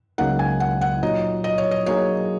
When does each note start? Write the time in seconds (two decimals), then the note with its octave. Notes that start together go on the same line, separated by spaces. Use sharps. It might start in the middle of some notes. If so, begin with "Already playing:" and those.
0.18 C#2 C#3 F#3 A#3 D#4 F#5
0.39 G#5
0.60 F#5
0.81 F#5
1.02 A#2 F#3 D#4 D#5
1.44 D#5
1.58 C#5
1.71 D#5
1.86 F#3 A#3 D#4 G#4 C#5